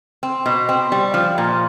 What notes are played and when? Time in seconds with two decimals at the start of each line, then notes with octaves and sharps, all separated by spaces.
0.23 C4
0.46 B2
0.69 C4
0.92 G3
1.14 F3
1.38 A#2